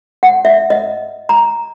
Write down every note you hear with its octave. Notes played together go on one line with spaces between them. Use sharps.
F#5
E5
D#5
A#5